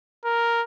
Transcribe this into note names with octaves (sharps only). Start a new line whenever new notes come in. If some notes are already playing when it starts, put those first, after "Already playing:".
A#4